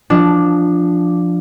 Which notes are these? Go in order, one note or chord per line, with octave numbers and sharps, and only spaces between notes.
F3 D4